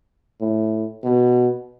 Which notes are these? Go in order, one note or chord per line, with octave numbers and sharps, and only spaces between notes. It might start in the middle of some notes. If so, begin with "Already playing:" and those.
A2
B2